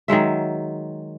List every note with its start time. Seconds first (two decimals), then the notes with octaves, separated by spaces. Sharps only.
0.08 D#3 F#3 G#3 E5